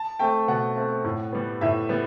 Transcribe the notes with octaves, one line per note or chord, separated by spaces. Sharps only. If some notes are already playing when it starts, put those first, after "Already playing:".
Already playing: A5
A3 C4 G5
B2 F#5
A3 C4
A2
G3 B3
A2 E5
G3 B3